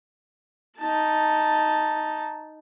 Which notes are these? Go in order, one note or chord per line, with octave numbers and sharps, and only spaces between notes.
D#4 A5